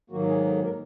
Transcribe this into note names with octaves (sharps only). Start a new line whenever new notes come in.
G#2 D#3 F#3 A#3 F#4
G#4
A4
A#4